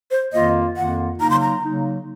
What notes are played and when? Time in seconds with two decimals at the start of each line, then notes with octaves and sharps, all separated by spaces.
0.11 C5
0.33 F2 D#3 A#3 F4 D#5
0.77 F2 D#3 A#3 F4 F#5
1.20 C#3 F#3 A#3 D#4 A#5
1.30 C6
1.40 A#5
1.63 C#3 F#3 A#3 D#4